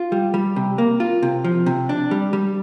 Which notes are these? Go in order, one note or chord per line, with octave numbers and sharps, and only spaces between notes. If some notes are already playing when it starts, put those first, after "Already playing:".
Already playing: F4
G3
G3
C3
A#3
F4
C3
F3
C3
D4
G3
G3